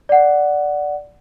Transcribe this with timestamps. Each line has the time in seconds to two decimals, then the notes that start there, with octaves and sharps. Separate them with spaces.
0.09 D5 F#5